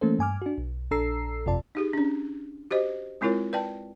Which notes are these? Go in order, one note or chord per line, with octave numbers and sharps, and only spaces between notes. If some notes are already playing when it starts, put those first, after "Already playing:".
E3 A3 A#3 C#4 A4 C5
G2 G#5 D6 F6
D4 F#4
B1
A#1 D4 A4 A#5 E6 C7
G1 F2 C3 F4 D5 A5
D#4 G4 G#4
C#4 D4
F#4 G4 C5 D#5
G#3 C4 E4 F4 A#4 C#5
B4 D5 G5 A5